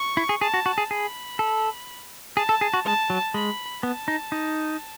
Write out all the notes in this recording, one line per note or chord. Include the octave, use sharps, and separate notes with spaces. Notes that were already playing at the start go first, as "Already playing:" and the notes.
Already playing: C#6
E4
G#4
G#4 A5
F#4
F#4
G#4
G#4 B5
A4
G#4 A5
A4
G#4
F#4
G#3 A5
F#3
G#3 B5
B3 A5
D#4
D#4